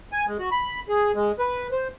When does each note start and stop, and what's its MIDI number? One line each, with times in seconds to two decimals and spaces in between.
0.12 0.26 80
0.28 0.37 56
0.39 0.49 66
0.52 0.80 83
0.88 1.12 68
1.15 1.32 56
1.39 1.67 71
1.72 1.88 72